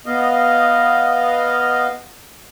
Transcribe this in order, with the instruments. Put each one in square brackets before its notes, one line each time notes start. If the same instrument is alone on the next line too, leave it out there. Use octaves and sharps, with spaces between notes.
[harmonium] B3 D#5 F5